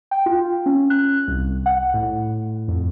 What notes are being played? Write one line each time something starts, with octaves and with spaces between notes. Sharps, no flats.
G5
F4
C#4
F#6
C2
F#5
A2
F2